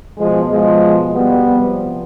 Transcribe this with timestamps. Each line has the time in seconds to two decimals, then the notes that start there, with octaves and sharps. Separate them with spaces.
0.18 B2 F3 G#3
0.50 F3 G#3
1.14 G3 B3
1.46 C3 F3